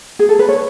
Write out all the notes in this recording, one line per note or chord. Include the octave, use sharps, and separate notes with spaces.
G#4
A4
B4
C#5